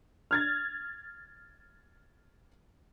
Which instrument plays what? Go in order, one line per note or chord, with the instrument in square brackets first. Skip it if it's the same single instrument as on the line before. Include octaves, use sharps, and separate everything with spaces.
[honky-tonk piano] F6 G#6 A6